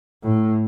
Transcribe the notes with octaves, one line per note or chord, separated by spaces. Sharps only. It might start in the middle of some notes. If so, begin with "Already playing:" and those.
A2